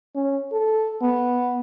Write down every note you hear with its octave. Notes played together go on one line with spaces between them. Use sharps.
C#4
A4
B3